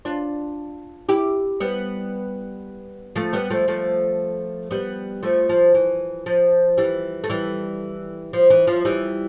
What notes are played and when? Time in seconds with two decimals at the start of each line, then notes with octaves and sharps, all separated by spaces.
0.05 D4 F4
1.09 E4 G4
1.60 G3 B3
3.16 F3 A3
3.33 G3 B3
3.50 F3 A3
3.68 F3 A3
4.71 G3 B3
5.23 F3 A3
5.49 F3
5.74 E3
6.26 F3
6.77 E3 G3
7.24 A3
7.29 E3 G3
8.33 F3
8.50 E3
8.67 F3
8.85 E3 G3